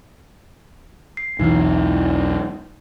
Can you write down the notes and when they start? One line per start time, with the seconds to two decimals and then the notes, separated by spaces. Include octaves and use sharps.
1.17 C7
1.40 B1 E2 E3 D#4 E4